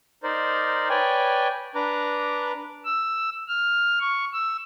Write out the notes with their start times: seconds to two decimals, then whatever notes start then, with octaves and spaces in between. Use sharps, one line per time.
0.23 D#4 A#4 C5 D5
0.90 B4 C#5 D5 G5 G#5
1.75 D4 B4 A#5 D6
2.85 E6
3.48 F6
4.01 C#6
4.33 E6